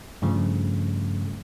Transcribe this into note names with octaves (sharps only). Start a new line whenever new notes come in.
G2 C#3 F3 A3